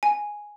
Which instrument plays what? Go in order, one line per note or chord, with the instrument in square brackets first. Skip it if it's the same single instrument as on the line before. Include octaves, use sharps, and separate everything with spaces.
[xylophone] G#5